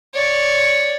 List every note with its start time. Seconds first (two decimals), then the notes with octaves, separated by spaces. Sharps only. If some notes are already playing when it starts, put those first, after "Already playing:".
0.14 C#5 D5